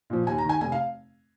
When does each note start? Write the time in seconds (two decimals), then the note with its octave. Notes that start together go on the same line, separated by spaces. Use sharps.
0.10 A#2 F3
0.27 D#2 G#5
0.38 A#5
0.44 D#3
0.49 G#5
0.61 F1 G#5
0.72 F5